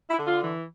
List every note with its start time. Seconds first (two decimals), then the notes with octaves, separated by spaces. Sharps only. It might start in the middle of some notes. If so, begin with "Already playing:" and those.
0.10 E4
0.18 D3
0.26 F4
0.42 E3